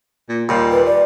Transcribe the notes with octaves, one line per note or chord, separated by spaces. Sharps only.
A#2
D#2 A#2 G3
B4
D5